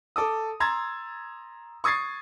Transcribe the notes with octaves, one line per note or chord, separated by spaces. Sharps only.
A4 D6 D#6
A#5 C6 E6 G#6 A6
C#6 D#6 G#6 A6 C7